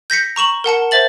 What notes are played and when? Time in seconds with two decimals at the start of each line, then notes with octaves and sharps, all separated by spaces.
0.10 G6 A#6 B6 C#7
0.36 A#5 C#6 E7 F#7
0.64 A#4 F#5 A5 C#7
0.91 C5 E5 A6 F#7